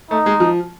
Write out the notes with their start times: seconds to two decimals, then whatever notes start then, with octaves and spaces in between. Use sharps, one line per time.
0.11 A3 D#4
0.26 G#3
0.40 F3